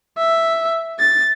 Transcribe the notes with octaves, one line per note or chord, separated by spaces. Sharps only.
E5
A6